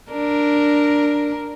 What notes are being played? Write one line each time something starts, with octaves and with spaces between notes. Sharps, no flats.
D4 A#4